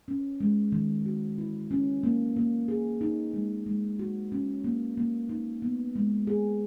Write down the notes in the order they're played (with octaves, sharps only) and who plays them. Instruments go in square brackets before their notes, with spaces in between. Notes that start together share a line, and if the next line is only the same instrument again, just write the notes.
[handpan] C#4
G#3
D#3
F#4
E4
C#4
A#3
A#3
G#4
D#4
G#3
G#3
F#4
C#4
A#3
A#3
D#4
B3
G#3
G#4